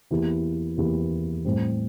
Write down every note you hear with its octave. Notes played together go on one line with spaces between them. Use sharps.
E2 E3 A#3 E4 G4
E2 E3 A#3 E4 G4
A2 G3 C4